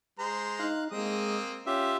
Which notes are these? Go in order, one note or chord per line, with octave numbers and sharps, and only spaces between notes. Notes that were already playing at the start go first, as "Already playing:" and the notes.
G#3 C5 A#5
D#4 F5 F#6
G#3 A#3 C4 D#5 D#6
C#4 F4 G4 E5